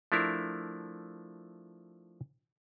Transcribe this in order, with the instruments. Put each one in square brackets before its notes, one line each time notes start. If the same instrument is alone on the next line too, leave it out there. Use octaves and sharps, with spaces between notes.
[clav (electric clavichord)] F3 A3 D4 E4 A#4